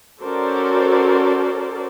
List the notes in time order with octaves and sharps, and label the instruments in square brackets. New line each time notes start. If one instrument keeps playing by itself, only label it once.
[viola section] C#4 F#4 A4 A#4 C5 D5